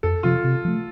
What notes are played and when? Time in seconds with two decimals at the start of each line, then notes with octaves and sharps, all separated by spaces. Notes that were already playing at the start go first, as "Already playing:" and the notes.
0.03 F2 A4
0.23 C3 F3 F4
0.44 C3
0.65 F3 A3